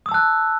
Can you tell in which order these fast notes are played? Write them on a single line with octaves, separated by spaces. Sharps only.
D#6 E6 A5 F#6